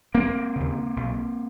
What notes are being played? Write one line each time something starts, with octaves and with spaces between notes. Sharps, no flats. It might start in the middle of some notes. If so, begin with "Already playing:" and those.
E1 A#3 C4
D#2 C#3
B1